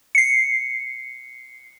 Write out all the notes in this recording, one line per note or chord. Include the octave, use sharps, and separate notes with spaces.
C7 C#7